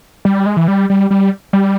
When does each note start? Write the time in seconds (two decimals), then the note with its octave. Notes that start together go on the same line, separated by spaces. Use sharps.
0.25 G3
0.46 G#3
0.57 E3
0.68 G3
0.90 G3
1.10 G3
1.53 G3